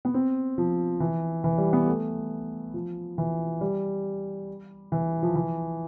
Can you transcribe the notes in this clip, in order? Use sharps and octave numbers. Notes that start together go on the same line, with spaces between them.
B3
C4
F3
E3
E3
G3
B3
A3
F3
E3
G3
E3
F3
E3